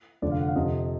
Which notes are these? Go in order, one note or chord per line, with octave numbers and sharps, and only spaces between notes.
F1 F2 D3 F3 D5
F5
F#5
F5
F2 C3 F3 D#5